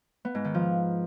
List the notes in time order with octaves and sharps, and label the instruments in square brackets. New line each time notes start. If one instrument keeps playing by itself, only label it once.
[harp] B3
G#2
D#3
F3